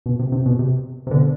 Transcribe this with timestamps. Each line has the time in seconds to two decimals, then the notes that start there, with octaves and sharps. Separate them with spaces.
0.06 B2
0.19 C3
0.32 C3
0.46 B2
0.59 C3
1.07 C3
1.11 B2 D3